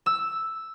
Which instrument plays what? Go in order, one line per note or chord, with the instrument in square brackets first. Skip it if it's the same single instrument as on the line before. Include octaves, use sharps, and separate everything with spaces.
[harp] E6